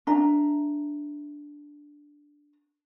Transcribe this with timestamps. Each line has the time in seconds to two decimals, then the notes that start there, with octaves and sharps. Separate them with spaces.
0.07 D4 E5 A#5